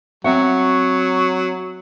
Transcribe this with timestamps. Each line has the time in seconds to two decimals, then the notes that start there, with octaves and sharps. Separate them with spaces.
0.24 F#3 C4 E5 F#5 C#6